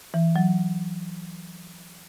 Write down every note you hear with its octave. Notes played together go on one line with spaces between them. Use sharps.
E3
F#3